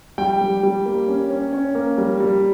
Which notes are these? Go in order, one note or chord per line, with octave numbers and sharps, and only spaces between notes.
G3 G5
G3
G3
A#3
C#4
C#4
C#4
A#3
G3
G3